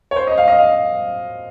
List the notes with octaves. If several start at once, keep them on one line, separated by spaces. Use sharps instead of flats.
C#5
C5
D#5
F5
D#5
F5